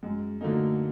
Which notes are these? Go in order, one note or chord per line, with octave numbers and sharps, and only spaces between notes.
F#2 G#3
D3 F#3 A3 A#3 D#4